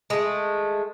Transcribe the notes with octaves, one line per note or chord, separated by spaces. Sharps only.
G#3 A3